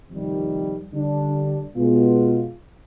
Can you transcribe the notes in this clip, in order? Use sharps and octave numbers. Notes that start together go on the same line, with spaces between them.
F2 C3 D#3 G3
D3 G3 D4
B2 G#3 B3 F4